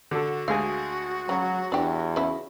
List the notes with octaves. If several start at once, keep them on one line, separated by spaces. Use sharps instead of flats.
D3 F#4 A4
D2 G#3 G#4 F5
C#3 F#3
E2 D4 G4
C#3 E4